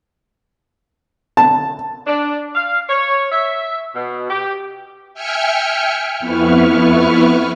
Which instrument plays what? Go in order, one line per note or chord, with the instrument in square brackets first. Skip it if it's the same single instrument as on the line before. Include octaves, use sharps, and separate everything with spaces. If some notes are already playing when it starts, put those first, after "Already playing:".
[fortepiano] A5
[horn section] D4
F5
C#5
E5
B2
G4
[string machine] E5 G5 G#5 F6 C#7
F2 B3 E4 B4 C#6 F6